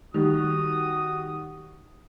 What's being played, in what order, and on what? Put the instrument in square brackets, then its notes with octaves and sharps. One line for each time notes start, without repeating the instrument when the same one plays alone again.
[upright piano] D#3 G3 [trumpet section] F#4 D#6